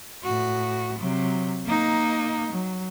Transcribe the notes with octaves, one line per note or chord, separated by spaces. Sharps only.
A2 F#4
C3 F#3
A#3 D#4
F#3